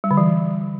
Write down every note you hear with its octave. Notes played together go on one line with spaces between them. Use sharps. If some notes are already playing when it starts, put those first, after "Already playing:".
G3
D3
E3